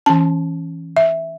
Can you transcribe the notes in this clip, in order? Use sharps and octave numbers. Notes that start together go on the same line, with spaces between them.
E3 C#4 A5
E5